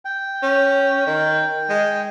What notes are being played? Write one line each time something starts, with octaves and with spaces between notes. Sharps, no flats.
G5
C#4
D#3
G#3